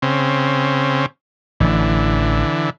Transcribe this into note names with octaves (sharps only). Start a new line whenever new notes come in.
C#3 C4
A1 D3 E3